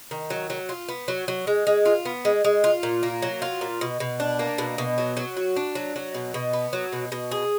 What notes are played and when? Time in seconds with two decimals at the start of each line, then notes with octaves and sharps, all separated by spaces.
0.11 D#3
0.30 F#3
0.50 F#3
0.69 F4
0.89 B3
1.08 F#3
1.28 F#3
1.47 G#3
1.67 G#3
1.86 F4
2.05 B3
2.25 G#3
2.44 G#3
2.64 F4
2.83 A#2
3.03 A#3
3.22 F#3
3.42 F4
3.61 A#2
3.81 B2
4.00 B2
4.20 D4
4.39 A#3
4.58 B2
4.78 B2
4.98 F#3
5.17 F#3
5.37 F#4
5.56 D4
5.75 F#3
5.96 F#3
6.14 B2
6.34 B2
6.53 B3
6.73 F#3
6.92 B2
7.12 B2
7.31 G#4